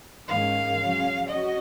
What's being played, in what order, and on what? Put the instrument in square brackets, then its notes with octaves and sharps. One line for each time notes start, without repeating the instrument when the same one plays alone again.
[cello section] G#2 D#3 A#3 C#4 G#4 [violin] F5
[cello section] C#3 F#3 C#4
[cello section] C#4 F#4 [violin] D#5